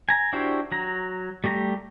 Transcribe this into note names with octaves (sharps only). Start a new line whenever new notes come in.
G#5 A#5
D4 E4 F#4 G4 C5
F#3 A#5
G3 A3 G4 A#5